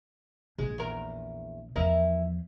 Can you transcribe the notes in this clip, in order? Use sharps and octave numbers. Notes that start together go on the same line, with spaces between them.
A#1 G#3
E2 A#4
E2 F3 E4 A#4 D#5